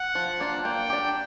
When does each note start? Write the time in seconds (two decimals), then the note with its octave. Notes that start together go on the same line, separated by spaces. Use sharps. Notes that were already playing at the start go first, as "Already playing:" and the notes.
Already playing: F#5
0.15 F3
0.40 A#3 D4 F4
0.65 A#3 G5
0.90 D4 G4